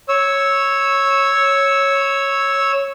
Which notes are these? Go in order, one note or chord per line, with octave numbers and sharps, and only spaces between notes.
C#5 E6